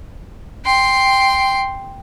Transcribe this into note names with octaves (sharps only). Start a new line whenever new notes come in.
G5 C6